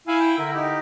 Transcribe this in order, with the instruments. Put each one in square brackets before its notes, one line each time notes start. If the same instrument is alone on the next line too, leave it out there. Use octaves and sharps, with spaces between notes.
[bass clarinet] E4 [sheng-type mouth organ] F5 G#5
[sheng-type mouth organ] G5
[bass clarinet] D3 [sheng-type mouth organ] E4 A#4
[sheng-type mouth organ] D#4 G4